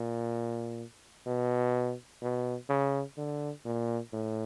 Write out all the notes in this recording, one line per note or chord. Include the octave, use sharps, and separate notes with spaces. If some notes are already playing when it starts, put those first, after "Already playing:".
Already playing: A#2
B2
B2
C#3
D3
A#2
A2